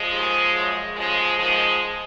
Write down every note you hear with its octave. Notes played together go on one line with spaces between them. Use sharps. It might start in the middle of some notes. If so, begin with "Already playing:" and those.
Already playing: F3 G#3
D#2 D#3
F#2 C#3
D#2 C#3 F3 G#3
G#2 D#3 F3 G#3